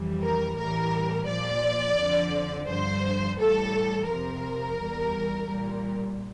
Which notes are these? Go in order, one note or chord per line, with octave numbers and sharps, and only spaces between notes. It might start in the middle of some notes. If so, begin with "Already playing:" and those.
Already playing: F2 E3 G3
A#4
A2 E3 G3 A#4
A#2 F3 D5
F2 D3 F3
G2 D3 F3 C5
A2 E3 G3 A4
F2 C3 F3 A#4
E2 E3 G3
A#2 G3